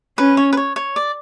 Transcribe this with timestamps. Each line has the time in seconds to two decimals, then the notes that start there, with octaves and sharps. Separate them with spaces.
0.18 C#4 B4
0.37 C#5
0.53 B4
0.57 C#5
0.76 C#5
0.96 D5